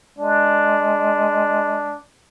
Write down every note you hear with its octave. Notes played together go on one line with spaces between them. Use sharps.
G#3 D4